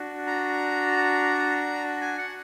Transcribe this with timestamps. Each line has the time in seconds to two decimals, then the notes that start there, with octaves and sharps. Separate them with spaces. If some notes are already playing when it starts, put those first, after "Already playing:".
Already playing: D4 F#4
0.27 A#5
2.01 G#5
2.18 F#5